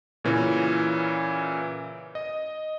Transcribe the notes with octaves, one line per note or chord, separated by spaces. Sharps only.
A#2 C#3 E3 C#4
D#5